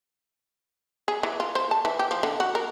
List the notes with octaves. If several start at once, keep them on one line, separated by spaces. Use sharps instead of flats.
G#4
E3
F4
C5
A5
E3
G4
F3
D3
F#4
A#4